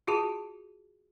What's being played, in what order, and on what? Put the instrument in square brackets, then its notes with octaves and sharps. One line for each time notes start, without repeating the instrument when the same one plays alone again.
[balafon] F4 F#4 G#4 A5